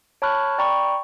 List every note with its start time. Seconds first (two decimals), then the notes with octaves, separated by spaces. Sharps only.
0.22 C#5 A5 B5 C#6 F6 F#6
0.58 D5 G5 A#5 B5 C#6